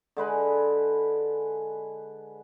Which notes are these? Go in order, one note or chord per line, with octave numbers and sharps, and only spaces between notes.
D3 G#3 B4 G#5